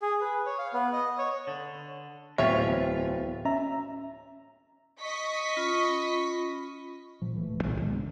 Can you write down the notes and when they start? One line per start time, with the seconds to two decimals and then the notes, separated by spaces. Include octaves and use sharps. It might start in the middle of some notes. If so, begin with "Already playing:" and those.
0.02 G#4
0.21 B4
0.46 C#5
0.58 F5
0.73 B3
0.93 D#5
1.18 C#5
1.47 D3
2.38 D1 E2 C4 F4 C#5 E5 G5
3.45 C#4 E5 A#5
5.01 D#5 C#6 B6
5.57 C#4 F4 B5
7.22 A#2 F3
7.35 D1 E3 A3
7.64 C2 A#2
7.81 A#2 D#3 G#3 B3
7.93 G#2 C#3 D4